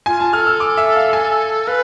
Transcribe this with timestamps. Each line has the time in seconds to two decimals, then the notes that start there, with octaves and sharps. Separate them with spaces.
0.06 F4 G#5
0.20 A5
0.33 A4 F6
0.47 E6
0.60 D6
0.77 E5
0.96 F5
1.13 G#5
1.67 B4 F5